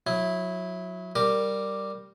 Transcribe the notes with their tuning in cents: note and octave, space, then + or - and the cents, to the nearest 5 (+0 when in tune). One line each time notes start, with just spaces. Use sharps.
F#3 -25 E4 +0
G3 +0 A#4 -10 D6 +0